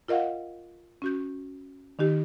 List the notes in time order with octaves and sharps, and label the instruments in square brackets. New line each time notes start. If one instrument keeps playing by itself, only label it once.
[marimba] F4 A#4 D#5 F5 F#5
C#4 F#4 G6
D#3 D#4 G4